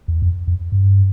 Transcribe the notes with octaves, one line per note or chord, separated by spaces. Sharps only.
E2
F2
F2
G2